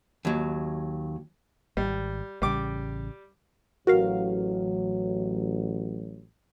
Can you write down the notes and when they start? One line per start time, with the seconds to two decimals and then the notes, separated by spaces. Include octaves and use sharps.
0.25 D#2 F#3
1.77 G#1 G3
2.42 A1 C#3 G3 D6
3.87 A1 F#3 F#4 A#4 F5